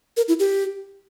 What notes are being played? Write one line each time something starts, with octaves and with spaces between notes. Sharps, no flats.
A#4
E4
G4